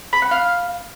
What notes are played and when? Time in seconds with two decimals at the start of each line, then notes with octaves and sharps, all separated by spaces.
0.13 B5
0.22 F#5
0.31 F5